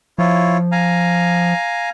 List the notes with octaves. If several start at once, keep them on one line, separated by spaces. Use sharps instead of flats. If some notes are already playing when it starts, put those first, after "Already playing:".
F3 E4 F4 C#5
F5 G#5 A#5